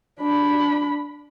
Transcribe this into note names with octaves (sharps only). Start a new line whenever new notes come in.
D4 B5